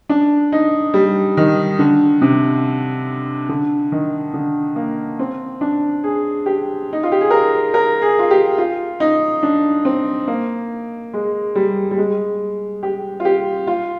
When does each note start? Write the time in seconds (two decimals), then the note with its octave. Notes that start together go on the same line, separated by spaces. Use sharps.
0.09 D4
0.52 D#4
0.94 G3
1.37 D#3
1.79 D3
2.21 C3
3.49 D3
3.92 D#3
4.34 D3
4.76 A#3
5.19 C4
5.61 D4
6.04 G#4
6.46 G4
6.93 D#4
7.03 F4
7.12 G4
7.21 G#4
7.31 A#4
7.74 A#4
8.02 G#4
8.19 F4
8.31 G4
8.58 F4
9.00 D#4
9.43 D4
9.85 C4
10.27 A#3
11.13 G#3
11.55 G3
11.91 G3
11.98 G#3
12.83 G4
13.20 F4
13.25 G4
13.67 F4